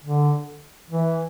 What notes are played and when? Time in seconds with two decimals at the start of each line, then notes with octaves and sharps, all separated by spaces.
0.04 D3
0.90 E3